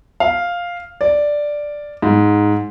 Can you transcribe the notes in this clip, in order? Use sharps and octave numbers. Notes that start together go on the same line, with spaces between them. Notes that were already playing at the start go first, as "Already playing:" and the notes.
F5
D5
G#2